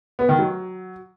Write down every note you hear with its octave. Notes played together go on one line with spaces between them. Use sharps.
B3
D#3
F#3